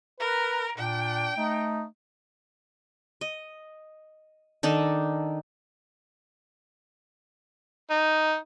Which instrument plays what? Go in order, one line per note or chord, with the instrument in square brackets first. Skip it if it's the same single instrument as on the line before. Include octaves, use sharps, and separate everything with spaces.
[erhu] A#4 [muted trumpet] B4
[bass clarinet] A#2 [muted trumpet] D4 [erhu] G5
[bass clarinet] A3 [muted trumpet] D#4
[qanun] D#5
D#3 D4 D#4 A4
[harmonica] D#4